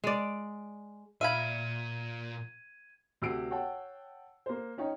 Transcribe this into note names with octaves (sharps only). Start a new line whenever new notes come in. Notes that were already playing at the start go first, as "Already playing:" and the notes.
G#3 D5
A#2 E5 F5 B5 G#6 D#7
D2 C3 E6 C7 D7
C#5 F#5 G5 A5
A#3 C5
C#4 D#4 C#5 G5